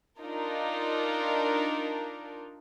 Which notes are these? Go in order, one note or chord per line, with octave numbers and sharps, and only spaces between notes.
D4 D#4 F4 A#4